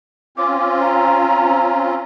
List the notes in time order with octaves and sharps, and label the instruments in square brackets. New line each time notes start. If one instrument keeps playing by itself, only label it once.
[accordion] C4 C#4 F4 [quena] D6
[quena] A#5